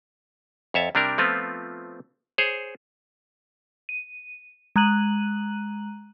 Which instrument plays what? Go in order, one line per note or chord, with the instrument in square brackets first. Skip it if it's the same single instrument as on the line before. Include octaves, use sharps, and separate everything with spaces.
[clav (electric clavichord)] F2 C#5 E5 A5
C3 G3 D4 G4 A#4
F3 A3 B3 C4 F4
G#4 C5 C#5
[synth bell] D#7
G#3 A#5 F#6 D#7 F#7